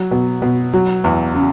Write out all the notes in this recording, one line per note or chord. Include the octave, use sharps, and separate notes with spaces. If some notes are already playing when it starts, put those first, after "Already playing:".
Already playing: F#3
B2
B2
F#3
E2
C#3